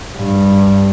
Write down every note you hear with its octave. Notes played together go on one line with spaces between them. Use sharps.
G2